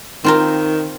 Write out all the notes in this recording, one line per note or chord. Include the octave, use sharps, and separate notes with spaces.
D#3 C4 F4 A#4